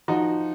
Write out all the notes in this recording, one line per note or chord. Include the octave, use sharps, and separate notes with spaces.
F3 D#4 F#4